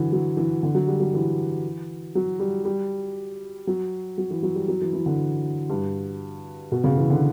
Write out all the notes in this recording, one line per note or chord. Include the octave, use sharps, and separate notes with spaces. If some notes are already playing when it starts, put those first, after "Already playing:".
Already playing: D3 E3 F#3
F#3
E3
D3
F#3
G3
F#3
E3
F#3
G3
G3
F#3
F#3
E3
F#3
G3
F#3
E3
E3
D3
G2
B2
C#3
E3
D3